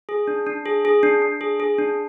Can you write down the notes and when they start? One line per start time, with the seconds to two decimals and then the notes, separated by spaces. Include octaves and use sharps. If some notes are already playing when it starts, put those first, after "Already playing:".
0.09 G#4
0.27 D4
0.47 D4
0.66 G#4
0.85 G#4
1.03 D4
1.22 D4
1.41 G#4
1.60 G#4
1.78 D4